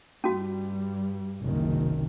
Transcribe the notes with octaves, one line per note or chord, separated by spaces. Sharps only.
G2 G3 C#4 F#4
F#1 C2 D#3